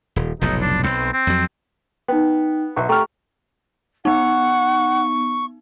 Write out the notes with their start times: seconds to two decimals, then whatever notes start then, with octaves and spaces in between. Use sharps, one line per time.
0.16 D#1
0.41 F1 B1 A2 D#4
0.61 D4
0.83 B1 C4
1.13 C4
1.27 F2 F#3
2.08 B3 D#4 G5
2.76 B1 E5 C#6
2.89 A3 G4 G5 A#5 C#6 F6
4.05 B3 D#4 F#5 C#6